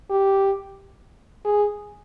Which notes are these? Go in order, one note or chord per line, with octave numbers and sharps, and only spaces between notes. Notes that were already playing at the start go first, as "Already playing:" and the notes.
G4
G#4